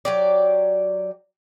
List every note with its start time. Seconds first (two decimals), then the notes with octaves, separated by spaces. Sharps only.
0.05 F#3 G4 D5